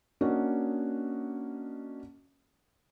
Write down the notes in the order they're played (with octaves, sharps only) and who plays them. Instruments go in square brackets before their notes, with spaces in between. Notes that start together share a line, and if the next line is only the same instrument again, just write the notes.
[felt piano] A#3 C#4 D4 F#4 D#5